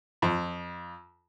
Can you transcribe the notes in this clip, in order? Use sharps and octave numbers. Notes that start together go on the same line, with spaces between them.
F2